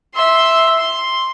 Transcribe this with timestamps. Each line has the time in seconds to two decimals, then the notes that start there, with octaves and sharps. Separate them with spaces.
0.14 E5 C6
0.78 C6